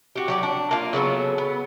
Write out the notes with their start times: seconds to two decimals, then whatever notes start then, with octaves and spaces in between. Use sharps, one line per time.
0.16 F#4 G4
0.28 F#3 G4 D5
0.43 D4
0.71 A#3 F4
0.93 C#3 F#3 B3 A4
1.38 B3